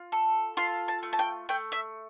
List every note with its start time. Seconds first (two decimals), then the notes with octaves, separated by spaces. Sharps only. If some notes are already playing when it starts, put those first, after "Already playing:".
Already playing: F4
0.12 A4
0.57 F4 C6
0.88 A5
1.03 A3
1.13 A5
1.19 G5
1.49 A3 G5
1.72 E5